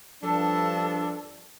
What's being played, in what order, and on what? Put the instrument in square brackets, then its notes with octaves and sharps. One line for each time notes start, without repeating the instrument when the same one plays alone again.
[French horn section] G2 [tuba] F3 [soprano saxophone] D4 [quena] A4